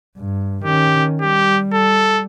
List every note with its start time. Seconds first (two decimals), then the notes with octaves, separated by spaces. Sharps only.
0.18 G2
0.64 D#3 C#4 G4
1.21 G3 G4
1.74 A4